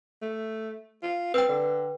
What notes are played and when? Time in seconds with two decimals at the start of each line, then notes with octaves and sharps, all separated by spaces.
0.22 A3
1.03 F4
1.34 C4 B4 G5
1.49 D3